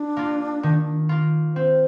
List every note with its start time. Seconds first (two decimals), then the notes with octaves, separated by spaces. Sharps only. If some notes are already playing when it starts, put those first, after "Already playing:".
Already playing: D4
0.17 A#3 F4
0.63 D#3
1.09 A#3 F4
1.55 C4 C5